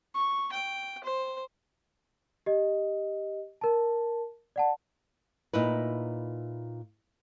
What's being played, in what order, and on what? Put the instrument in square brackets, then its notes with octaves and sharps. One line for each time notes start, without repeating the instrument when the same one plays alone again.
[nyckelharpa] C#6
G5
C5
[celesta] G4 D#5
A#4 A5
D5 F#5 A5
[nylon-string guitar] A#2 D#4 E4 B4